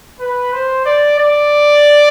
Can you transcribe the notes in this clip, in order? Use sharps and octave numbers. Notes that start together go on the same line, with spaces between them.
B4
C5
D5
D5